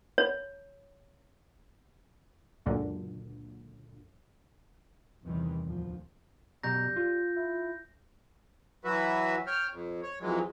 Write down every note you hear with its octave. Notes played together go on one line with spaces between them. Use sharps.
C#5
C#2 F#2 A#2 D3
E2 C3 D#3 E3 G3
D2 A2 F3
F#2 B2 G3 A#5 G6 A#6
F4
E4
E3 F#3 F#4 B4 E5
C#5 G5 F6
F2
C#5
F2 E3 F#3 G#3